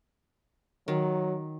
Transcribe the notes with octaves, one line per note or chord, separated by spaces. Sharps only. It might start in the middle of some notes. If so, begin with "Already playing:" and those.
D#3 F#3